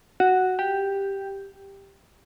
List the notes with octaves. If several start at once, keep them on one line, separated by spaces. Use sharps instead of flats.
F#4
G4